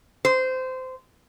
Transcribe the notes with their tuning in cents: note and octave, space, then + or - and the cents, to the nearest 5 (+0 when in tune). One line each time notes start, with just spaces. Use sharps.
C5 -20